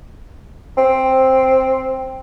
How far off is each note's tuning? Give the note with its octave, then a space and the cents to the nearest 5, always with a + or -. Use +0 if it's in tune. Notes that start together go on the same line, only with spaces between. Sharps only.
C4 +5